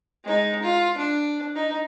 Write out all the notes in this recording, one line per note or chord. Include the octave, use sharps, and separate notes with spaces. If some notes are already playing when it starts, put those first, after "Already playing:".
G#3 D#4
F4
D4
D#4